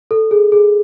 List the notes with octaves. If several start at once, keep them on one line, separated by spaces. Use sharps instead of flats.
A4
G#4
G#4